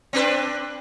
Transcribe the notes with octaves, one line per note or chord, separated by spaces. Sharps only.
C4 D4 B4